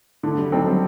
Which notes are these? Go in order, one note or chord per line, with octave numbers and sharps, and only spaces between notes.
D3 A3
G3
F#3 G3 C4 D#4 A4
F#3